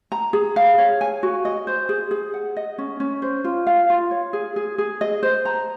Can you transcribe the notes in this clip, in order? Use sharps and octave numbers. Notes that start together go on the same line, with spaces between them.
A#5
G#4
F5
C#5
G#5
F#4
D#5
C5
G#4
G#4
F#5
D#5
C#4
C#4
C5
F4
F5
F4
C#5
G#4
G#4
G#4
D#5
C5
A#5